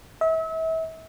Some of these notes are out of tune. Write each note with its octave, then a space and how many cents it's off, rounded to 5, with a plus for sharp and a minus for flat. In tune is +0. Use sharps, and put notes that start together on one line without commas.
E5 -35